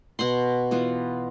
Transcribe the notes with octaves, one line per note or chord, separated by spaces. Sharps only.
B2 F#5 C6
E3 B3 F4